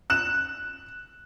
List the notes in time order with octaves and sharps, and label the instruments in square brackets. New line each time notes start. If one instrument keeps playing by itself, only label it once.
[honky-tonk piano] F#6 E7